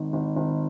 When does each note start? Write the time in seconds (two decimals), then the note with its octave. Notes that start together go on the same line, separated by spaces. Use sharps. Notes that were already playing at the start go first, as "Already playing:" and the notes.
Already playing: G#1 D#3
0.13 G#1
0.36 G#1